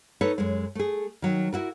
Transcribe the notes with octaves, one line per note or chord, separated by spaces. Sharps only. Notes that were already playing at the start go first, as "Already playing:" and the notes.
D#4 A4 B4 C#5
F#2 G#3
A3 G#4
D#3 F#3
E4 F#4 A#4